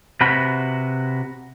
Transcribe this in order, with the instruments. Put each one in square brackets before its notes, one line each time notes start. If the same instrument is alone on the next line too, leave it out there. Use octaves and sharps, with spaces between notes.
[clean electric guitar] C3 F#4 B4 B5